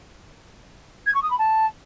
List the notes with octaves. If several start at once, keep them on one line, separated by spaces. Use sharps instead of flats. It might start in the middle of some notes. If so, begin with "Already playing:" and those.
G#6
C#6
D#6
B5
A5